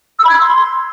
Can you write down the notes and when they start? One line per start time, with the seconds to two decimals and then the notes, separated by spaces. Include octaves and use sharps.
0.18 E6
0.23 B5
0.29 G#6
0.35 B5
0.41 C6